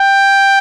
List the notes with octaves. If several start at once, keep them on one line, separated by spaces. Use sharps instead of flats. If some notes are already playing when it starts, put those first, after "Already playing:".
Already playing: G5